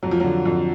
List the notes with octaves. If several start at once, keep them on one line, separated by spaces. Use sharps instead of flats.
F2 F#3
F3
D3 F#3
F2